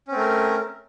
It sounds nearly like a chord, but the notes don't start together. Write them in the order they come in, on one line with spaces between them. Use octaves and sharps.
C#4 C4 A3 A#4